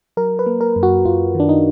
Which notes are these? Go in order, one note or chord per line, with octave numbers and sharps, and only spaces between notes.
F#3 A#4
B4
A#3
A#4
F#2
F#4
F#2 F4
D#3 D4
D#4